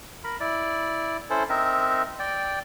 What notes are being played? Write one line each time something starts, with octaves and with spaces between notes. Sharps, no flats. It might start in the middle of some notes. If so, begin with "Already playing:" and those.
A#4 B5
E4 D5
C#4 E4 A4 C5
C4 D#4 A#4 E5
D5 G5